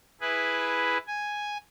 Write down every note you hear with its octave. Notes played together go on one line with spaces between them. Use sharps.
E4 G#4 B4
G#5